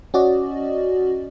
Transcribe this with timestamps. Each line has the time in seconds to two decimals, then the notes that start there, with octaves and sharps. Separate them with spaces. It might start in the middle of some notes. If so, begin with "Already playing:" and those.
0.14 C#4 F#4 D5 D#5